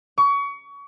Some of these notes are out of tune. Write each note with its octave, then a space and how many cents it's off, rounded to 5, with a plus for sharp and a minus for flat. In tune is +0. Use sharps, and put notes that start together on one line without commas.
C#6 +30